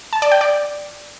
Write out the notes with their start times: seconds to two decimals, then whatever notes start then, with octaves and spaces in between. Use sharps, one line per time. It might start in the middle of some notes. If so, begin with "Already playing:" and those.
0.13 A5
0.22 D5
0.32 G5
0.41 D5